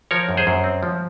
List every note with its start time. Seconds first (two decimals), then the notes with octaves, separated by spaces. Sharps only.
0.11 F3 A#4 C#5
0.29 F#2
0.37 G#4 C5
0.47 F#2
0.64 C4
0.83 F3